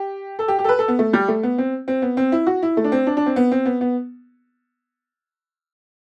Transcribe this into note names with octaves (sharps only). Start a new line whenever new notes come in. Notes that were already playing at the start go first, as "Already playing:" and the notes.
Already playing: G4
A4
G4
G4
A4
B4
A4
B3
A3
G3
A3
B3
C4
C4
B3
C4
E4
F#4
E4
A3
D4
C4
D4
D4
C4
B3
C4
B3
B3